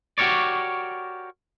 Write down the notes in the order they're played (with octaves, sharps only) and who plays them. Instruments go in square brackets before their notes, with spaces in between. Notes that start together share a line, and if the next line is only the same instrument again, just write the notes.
[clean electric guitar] F#4 G4 A#4 C#5 D5